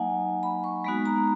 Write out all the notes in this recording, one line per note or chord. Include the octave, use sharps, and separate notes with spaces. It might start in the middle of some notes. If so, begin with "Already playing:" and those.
Already playing: F#3 A#3 D#4 D#5 F#5 G#5
B5
C#6
G#3 B3 D#4 F#4 B5
A#5